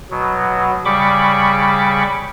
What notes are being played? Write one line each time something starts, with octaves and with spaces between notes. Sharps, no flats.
B2 F#3
C#3 G3 B5 C#6 D6